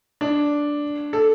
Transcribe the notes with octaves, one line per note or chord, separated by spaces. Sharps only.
D4
A4